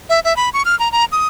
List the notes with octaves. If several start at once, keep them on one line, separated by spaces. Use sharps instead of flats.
E5
E5
B5
C#6
F6
A#5
A#5
D#6